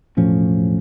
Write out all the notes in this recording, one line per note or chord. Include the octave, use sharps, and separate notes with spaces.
E1 A2 F3 C#4